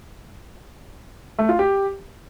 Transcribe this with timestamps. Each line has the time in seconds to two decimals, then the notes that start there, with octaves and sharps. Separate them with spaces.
1.39 A3
1.49 F4
1.59 G4